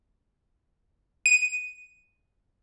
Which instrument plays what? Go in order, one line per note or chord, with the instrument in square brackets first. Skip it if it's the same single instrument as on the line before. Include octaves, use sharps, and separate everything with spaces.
[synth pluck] D#7